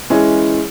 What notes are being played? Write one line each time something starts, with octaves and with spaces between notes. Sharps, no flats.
E3 G#3 C#4 E4 G#4